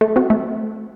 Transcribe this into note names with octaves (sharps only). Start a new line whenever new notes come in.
A3
C4 F#4
A3